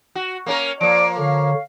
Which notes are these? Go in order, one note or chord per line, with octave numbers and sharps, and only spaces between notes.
F#4
A#3 C#4 A#4
F3 A#3 D5 D7
D3 C#5 F5